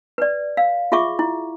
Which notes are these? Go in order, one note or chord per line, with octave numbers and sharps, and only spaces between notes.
B4 D5
F5
F4 G#4 E5 C#6 D6
E4